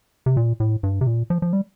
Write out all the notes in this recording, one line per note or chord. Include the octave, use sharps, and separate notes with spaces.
C3
A#2
A2
G2
C3
A#2
F3
F3
G3